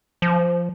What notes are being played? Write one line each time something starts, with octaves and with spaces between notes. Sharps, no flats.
F3